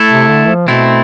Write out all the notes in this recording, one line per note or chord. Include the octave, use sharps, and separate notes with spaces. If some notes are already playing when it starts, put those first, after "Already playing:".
Already playing: A3 E4 A4
C3
D3
F3
B2 A3 C4 E4